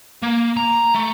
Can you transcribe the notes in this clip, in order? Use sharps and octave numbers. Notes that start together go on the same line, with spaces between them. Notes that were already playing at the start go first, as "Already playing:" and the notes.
A#3
A#5
A3